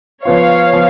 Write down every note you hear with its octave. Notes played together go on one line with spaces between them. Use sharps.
F3 B3 F4 C#5 F5
F3 B3